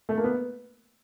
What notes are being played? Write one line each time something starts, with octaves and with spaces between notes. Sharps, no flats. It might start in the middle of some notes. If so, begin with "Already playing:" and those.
A3
A#3
B3